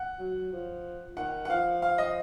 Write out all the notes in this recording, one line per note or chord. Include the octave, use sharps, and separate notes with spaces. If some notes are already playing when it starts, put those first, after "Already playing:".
Already playing: F#5
F#3
F3
D#3 F#5
F#5
F3 F5
F5
D#5